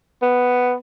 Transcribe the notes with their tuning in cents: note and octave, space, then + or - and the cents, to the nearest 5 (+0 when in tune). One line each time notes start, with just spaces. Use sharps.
B3 +5